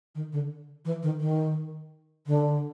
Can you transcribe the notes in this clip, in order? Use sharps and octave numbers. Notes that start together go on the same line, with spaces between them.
D#3
D3
E3
D#3
D#3
D3